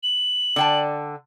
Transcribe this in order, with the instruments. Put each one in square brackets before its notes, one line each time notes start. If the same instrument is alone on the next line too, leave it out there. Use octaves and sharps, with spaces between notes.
[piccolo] F#7
[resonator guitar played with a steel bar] D3 G5 A5